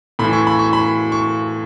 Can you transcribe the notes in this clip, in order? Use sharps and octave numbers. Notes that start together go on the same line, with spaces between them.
A2 E3 B5
C#6
B5
C#6
B5
C#6